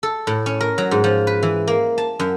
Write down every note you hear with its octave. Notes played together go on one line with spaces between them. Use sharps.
A4
A2
C#4
A#4
F#3
G#2
F3
B4
E3
A#3
A5
F#2